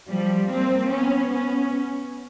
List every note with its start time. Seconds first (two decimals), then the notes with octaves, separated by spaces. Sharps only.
0.08 F3 G3
0.48 A#3 C4
0.88 B3 C#4
1.29 B3 C#4